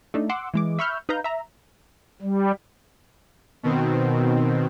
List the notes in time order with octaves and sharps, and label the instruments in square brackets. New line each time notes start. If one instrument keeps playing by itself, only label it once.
[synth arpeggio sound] A3 D4 D#4
F#5 C6 D6 E6
E3 G#3 D6
E5 B5 C#6 E6 F6 G6
D#4 B4 F5 A#5 G6
E5 A#5
[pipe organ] G3
[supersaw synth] B2 D#3 C4